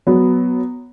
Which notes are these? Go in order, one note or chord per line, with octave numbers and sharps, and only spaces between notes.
F#3 B3